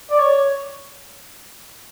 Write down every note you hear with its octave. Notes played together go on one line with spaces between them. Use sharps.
D5
C#5